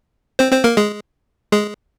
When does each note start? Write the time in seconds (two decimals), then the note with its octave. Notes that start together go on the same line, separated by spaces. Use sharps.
0.39 C4 C5
0.52 C4 C5
0.64 A#3 A#4
0.77 G#3 G#4
1.52 G#3 G#4